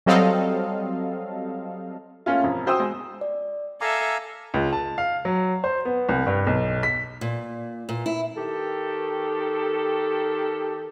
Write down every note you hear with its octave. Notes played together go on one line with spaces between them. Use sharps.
F#3 G3 C4 A4 D#5 F5
A3 A#3 C#4 F4
E1 F2
F#4 C5 G5 D#6 E6
G#3
D5
A4 E5 F5 G#5 A#5 D6
C#2
A5
F5
F#3
C5
B3
C2
G2
B1
B6
A#2
A#2
E4
D#3 G4 A4